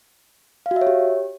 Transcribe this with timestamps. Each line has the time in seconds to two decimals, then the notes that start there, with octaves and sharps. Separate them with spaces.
0.66 F5
0.71 F#4
0.76 E5
0.81 C#5
0.87 G4